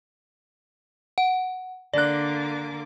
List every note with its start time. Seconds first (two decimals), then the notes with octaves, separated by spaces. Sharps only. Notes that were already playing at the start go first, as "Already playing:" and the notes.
1.18 F#5
1.94 D3 A#3 D5 D6 F#6